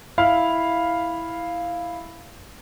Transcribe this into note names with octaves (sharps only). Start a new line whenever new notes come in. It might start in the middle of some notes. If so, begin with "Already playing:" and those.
E4 F5 B5